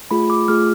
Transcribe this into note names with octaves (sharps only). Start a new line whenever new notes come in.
A3 F4 G#4 B5
D6
A3 F4 G#4 F6